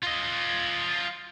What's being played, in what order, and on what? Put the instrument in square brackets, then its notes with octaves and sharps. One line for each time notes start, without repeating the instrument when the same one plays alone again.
[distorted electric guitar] F4 D#5